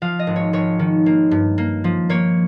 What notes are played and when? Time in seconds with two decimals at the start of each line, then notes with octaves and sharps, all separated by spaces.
0.02 F3 F5
0.19 D#5
0.27 G#1
0.36 C#5
0.53 G#1 C#5
0.79 D#3
1.06 A#3
1.31 G2
1.58 A#3
1.84 F3
2.09 A#3 C#5